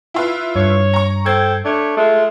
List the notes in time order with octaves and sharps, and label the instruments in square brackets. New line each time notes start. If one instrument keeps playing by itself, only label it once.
[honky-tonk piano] E4 F4 B4
[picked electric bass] G2 [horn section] C#5
[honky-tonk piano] A#5 C#6
[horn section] A4 C5 G5 [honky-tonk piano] G#6
[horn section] A3 D4 C#5
G#3 A3 F4